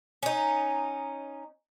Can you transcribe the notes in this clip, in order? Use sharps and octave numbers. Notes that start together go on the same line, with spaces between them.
C#4 D#4